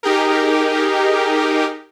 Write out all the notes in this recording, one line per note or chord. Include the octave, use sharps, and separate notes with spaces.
D#4 G4 G#4 A#4